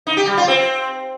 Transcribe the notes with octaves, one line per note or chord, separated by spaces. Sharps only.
D#4
G4
G3
F4
C4